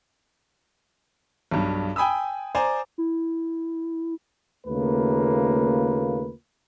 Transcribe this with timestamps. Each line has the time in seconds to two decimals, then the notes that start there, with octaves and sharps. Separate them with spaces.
1.51 B1 G2
1.96 G5 G#5 B5 D#6 E6
2.55 C5 D5 G#5 A#5
2.98 E4
4.67 D#2 C#3 A3 A#3 F4 B4